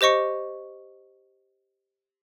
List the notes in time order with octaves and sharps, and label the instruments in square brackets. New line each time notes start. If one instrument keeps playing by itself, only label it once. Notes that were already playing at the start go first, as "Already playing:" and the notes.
[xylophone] G4 C5 D#5 C#6 C#7